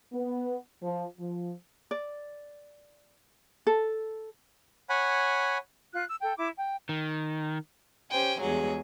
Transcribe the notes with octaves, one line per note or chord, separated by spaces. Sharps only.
B3
F3
F3
D5
A4
C#5 F#5 G#5 B5
F4 F#6
E6
A4 G5
E4 D6
G5
D#3
C#4 G4 C5 G5 G#5
E2 G2 F#3 G#3 G#4